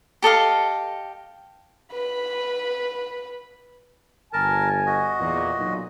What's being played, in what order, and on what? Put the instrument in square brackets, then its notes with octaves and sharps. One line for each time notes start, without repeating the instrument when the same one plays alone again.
[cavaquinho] G4 A4 D#5 F5
[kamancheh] B4 B5
[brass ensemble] G1 G#5 [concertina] A#4 A5
[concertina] F#4 D#5
[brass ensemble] E2 A#2
B1 A#2